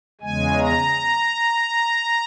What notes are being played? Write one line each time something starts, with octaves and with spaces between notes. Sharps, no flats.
E2 C#3 G#3 G#5
A#5